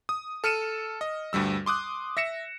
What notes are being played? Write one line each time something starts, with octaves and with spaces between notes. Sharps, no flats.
D#6
A4 F6 C#7 D#7 E7
D#5
D2 G2 G3 E6
C6 D6 D#6 F#6
E5 A#6 C#7 E7